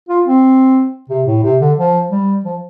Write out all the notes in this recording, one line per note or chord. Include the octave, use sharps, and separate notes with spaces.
F4
C4
C3
A2
C3
D3
F3
G3
F3